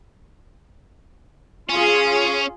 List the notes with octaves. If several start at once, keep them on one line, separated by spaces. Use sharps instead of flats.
C#4 F4 G#4